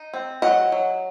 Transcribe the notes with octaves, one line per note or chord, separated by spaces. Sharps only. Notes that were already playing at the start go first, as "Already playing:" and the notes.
Already playing: D#4
C4
F#3 D#5 F#5
F#3